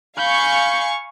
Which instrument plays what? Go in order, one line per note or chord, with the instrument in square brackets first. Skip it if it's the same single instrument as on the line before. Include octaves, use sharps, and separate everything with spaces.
[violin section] F5 G#5 C#6 [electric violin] B5 G6